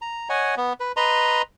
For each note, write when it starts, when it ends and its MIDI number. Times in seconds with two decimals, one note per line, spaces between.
0.02 0.28 82
0.29 0.55 73
0.29 0.55 75
0.29 0.55 78
0.29 0.55 80
0.57 0.73 59
0.80 0.92 71
0.97 1.42 71
0.97 1.42 75
0.97 1.42 82
0.97 1.42 84